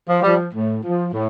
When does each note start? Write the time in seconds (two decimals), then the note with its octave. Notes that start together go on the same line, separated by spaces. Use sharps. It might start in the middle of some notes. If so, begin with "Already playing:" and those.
0.09 F3
0.23 F3 G3
0.53 A2
0.83 F3
1.13 A2